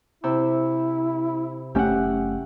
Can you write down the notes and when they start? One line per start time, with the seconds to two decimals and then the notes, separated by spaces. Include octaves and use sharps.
0.24 C3 E4 E6
1.75 F#1 A3 C#4 G4 E5 F#5